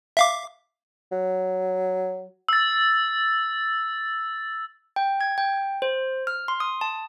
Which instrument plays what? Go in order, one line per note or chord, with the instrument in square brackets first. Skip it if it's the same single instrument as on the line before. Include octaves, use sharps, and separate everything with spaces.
[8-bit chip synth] E5 F5 D6
[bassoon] F#3
[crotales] E6 A6
[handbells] G5
G#6
G5
C5
F6
C6
D#6
A5